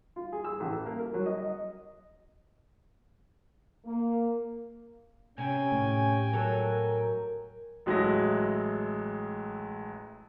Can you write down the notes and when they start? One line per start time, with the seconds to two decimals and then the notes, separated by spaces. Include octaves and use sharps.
0.16 F4
0.32 G#4
0.44 E6
0.60 A1
0.72 A4
0.86 A#3
0.99 A#4
1.14 F#3
1.26 D#5
1.38 D#5
3.86 A#3
5.38 C3 C#4 G5 G#5
5.72 A2
6.33 F#3 A4 A#4
7.86 A1 F#3 G#3 E4 A4 A#6